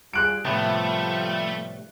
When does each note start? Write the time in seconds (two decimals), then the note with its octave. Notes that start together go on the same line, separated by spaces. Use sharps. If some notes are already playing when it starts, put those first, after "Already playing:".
0.13 G3 F4 G#4 F#6 D7
0.45 A2 C3 F3 G3 A3 B3